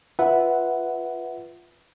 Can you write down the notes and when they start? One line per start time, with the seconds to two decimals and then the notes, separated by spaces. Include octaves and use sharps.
0.19 F4 B4 E5 F#5